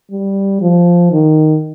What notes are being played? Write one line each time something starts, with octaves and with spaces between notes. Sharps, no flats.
G3
F3
D#3